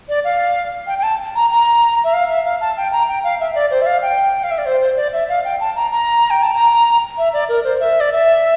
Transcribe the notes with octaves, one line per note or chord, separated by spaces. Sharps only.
D5
F5
G5
G5
A5
A#5
A#5
E5
F5
E5
F5
A5
G5
A#5
G5
F5
E5
D5
C5
E5
F5
G5
F5
E5
D5
C5
C5
D5
E5
F5
G5
A5
A#5
A#5
G5
A5
A#5
E5
D5
A#4
C5
E5
D5
E5